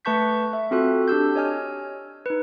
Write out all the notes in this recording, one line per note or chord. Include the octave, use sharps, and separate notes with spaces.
A3 B4 A5 C#6 G6 B6
E5
C4 F4 F#4 A4 F#6
D4 G4 E6 G6
C#5 D#5 G#5 F6
D#4 B4